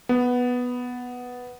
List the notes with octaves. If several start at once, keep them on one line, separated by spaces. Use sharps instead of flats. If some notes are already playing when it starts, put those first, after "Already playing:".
B3